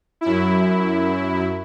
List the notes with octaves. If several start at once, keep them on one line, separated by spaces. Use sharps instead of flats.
F#2 E4